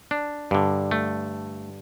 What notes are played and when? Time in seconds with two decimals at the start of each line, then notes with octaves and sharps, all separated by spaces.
0.11 D4
0.51 G2 D3
0.91 A3